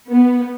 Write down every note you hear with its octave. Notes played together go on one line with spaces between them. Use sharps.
B3